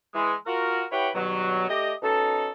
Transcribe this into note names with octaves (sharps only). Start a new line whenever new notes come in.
E3 G#3
F4 F#4 A#4
E4 G4 B4 C#5 F#5 G5
G2 B2 D#3 F#3
A3 G4 D5 D#5
B2 C#4 D#4 A4